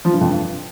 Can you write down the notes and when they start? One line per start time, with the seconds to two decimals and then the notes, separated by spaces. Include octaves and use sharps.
0.05 F3
0.13 G2
0.21 F2
0.30 G2